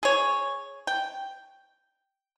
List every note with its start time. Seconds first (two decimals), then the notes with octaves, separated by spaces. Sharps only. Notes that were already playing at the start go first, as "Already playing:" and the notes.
0.03 G#4 C#5
0.87 G5